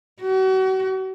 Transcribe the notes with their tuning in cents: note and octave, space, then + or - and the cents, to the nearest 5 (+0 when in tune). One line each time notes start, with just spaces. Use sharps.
F#4 +40